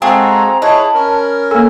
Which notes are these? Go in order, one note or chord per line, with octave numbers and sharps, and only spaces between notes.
G#3 C4 F4 F#4 G#4 A4 A#5
E4 G#4 B4 C#5 D#5 A5
C#4 A#4
A#3 A4 G#5